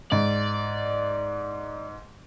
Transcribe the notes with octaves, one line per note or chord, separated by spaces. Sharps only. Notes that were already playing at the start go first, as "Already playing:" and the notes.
G#2 D5